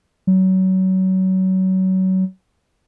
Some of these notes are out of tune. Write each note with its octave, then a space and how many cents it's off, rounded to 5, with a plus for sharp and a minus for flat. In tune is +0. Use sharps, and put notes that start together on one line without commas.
F#3 +25